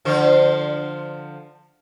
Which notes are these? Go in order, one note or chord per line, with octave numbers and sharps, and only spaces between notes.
D3 F3 C5